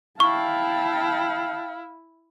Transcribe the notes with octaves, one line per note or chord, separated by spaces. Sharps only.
E4 E5 F5 G5 A5 C#6